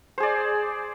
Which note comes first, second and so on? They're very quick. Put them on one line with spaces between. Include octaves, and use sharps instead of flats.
C5 G#4 D5